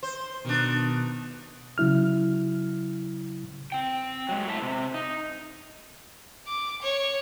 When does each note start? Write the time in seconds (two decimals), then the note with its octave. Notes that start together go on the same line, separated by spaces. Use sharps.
0.03 C5
0.45 B2 D#3 D4
1.78 C#3 F#3 E4 F6
3.72 C4 G5
4.29 F#3 G#3
4.47 A2 C3 E4 E5 A5
4.62 C3
4.94 D#4
6.48 D6
6.82 C#5